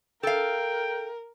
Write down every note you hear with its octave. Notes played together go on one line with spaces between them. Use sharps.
A4 A#4 F5 G5